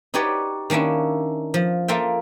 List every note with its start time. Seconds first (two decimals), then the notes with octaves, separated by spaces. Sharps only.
0.14 D#4 F#4 G4 B4 C#5 D5
0.70 D#3 A#3 C#4 D4 E4
1.54 F3
1.88 A#3 F4 A4 E5 G5